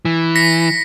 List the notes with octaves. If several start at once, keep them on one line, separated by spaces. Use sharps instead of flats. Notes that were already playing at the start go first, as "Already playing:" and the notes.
E3
A#6 B6 C#7